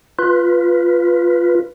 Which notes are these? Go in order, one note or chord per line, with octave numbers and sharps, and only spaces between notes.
F4 B4